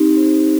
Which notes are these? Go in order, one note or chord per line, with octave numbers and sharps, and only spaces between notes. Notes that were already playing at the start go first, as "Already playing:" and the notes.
Already playing: C4 D#4 G4
C5